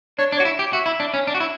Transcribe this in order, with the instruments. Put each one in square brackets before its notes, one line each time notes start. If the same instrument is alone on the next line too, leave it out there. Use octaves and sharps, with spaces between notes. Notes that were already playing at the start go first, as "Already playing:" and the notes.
[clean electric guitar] D4 [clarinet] C#5
[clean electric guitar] D4
[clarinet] C#5
[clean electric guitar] F#4
E4
G4
[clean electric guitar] F#4 [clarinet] E5
[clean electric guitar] E4
D4
C#4
D4
F#4
E4